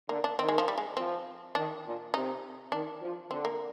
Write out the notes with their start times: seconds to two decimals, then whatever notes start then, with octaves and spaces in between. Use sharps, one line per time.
0.09 D3 A#3
0.24 D4
0.39 D#3 C4
0.48 G#3
0.58 F3
0.68 G3
0.78 G#3
0.97 F3 C4
1.55 D#3 D4
1.85 A#2
2.14 C3 D#4
2.72 D#3 D4
3.01 F3
3.30 D3 C4
3.45 A#3